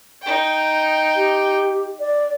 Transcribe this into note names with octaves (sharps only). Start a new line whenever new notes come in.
D#4 G5
G4
D5